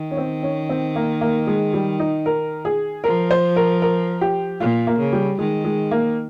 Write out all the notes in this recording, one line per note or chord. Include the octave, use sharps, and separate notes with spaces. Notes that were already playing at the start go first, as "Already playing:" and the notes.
Already playing: D#3
C#4
C4
C#4
C4
A#3
A#3
G#3
G3
D#4
A#4
G#4
F3 A#4
C5
A#4
A#4
G4
A#2 F4
A#3
C#3
G3
D#3 G#3
G#3
A#3